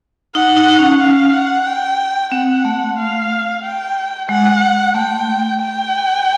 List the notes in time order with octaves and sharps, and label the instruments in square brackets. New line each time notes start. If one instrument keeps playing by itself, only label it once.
[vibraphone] D#4 [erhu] F#5
[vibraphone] D#4
C#4
[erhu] F5
F#5
G5
[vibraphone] C4 [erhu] F#5
[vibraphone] A3
[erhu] F5
G5
[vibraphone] G#3 [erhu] F#5
[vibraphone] A3 [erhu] G5
[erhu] G5